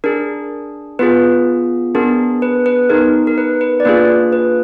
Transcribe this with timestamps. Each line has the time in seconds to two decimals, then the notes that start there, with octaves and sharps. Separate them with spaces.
0.04 D4 G#4 A#4
0.99 B3 F4 G#4 B4
1.95 B3 D4 G#4 A#4
2.42 B4
2.66 B4
2.90 B3 D#4 G#4 A#4
3.27 A#4
3.38 B4
3.61 B4
3.80 D5
3.85 A#3 D4 F4 G#4 B4
4.32 B4